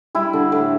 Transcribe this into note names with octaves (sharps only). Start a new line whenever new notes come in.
G3 E4
D3
A2